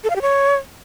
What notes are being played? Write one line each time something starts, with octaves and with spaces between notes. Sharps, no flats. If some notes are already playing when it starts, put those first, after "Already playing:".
A4
F5
G4
C#5